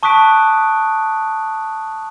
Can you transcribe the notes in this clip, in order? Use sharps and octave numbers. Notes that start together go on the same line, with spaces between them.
A5 C#6 D#6 F#6 B6 D7